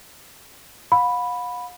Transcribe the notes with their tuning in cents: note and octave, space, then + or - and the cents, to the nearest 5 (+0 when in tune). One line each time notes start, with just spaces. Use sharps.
F5 +45 B5 +0